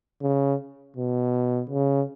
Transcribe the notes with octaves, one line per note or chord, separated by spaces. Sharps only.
C#3
B2
C#3